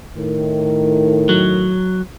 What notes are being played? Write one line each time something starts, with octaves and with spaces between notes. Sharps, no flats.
A2 D#3 A#4
F#3